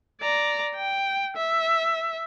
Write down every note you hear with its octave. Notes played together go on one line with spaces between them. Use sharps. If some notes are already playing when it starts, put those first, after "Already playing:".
D5 A#5
G5
E5